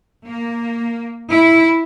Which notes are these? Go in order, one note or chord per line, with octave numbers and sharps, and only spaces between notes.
A#3
E4